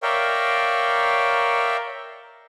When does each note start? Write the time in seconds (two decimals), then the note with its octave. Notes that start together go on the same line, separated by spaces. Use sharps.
0.03 A#4 C#5 D5 E5 F5 G5